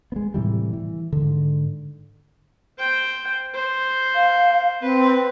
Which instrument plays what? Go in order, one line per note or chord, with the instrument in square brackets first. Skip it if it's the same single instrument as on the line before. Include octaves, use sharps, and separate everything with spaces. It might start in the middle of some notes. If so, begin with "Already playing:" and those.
[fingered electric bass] G#3 B3
A2 C3 E3 G3
E3
G#2 D3
[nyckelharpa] C5 G5
C5
[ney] F5
[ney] C4 [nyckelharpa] B4